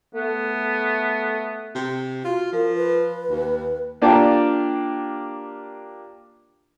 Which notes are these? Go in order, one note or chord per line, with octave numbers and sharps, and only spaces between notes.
A3 B3
C3
F4 F#4
F3 A#4
B4
D#2
A#3 D4 F4 G4 D5 A5